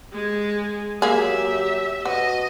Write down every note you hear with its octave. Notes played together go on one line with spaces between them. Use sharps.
G#3 G#4
F#3 A#3 G4 G#4 E5
B2 F#4 D#5